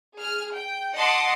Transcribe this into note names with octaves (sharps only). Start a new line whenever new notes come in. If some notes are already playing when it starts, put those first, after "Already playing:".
G#4 F6
G5
D#5 F#5 A5 C6 D6 D#6